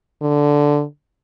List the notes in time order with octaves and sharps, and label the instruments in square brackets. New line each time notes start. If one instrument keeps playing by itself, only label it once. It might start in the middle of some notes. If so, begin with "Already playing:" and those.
[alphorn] D3